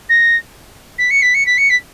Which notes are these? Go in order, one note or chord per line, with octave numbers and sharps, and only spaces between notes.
A#6
B6
C#7
B6
C#7
B6
C#7
B6